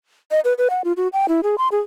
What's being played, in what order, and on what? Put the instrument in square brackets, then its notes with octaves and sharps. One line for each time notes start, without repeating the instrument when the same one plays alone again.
[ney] D#5
B4
B4
F#5
F4
F#4
G5
E4
G#4
C6
G#4